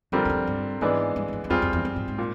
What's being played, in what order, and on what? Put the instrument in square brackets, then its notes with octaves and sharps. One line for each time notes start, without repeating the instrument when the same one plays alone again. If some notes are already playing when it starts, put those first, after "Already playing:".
[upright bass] F2 [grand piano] D3 G3 C4 F4 A#4
[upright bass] E2
F2
G2
[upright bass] G#2 [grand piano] E3 G#3 B3 D4
[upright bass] G2
G2
F#2
E2
[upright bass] F2 [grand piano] G3 C4 F4 G#4
[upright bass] F2
E2
F#2
G#2
G#2
[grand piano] A#2